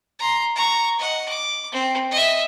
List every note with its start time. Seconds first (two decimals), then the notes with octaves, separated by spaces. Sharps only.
0.19 A#5 C6
0.56 A#5 C#6
0.99 D#5 F#5
1.29 D6
1.72 C4
2.11 D#5 E5